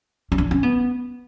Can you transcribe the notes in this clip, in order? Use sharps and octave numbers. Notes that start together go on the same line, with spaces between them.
C#4
D4
C#4
B3